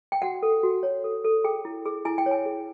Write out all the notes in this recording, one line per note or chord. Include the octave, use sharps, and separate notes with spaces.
G5
F#4 F#5
A4
F#4
C#5
A4
A4
G#4 G5
E4
G#4
E4 G#5
G5
C#5
G#5
G#4